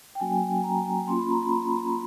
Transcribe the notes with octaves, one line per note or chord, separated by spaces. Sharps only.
G5
F#3 A#3 C#4 F#4 G#5
A#5
A#3 C#4 F4 C6
B5
A#5
B5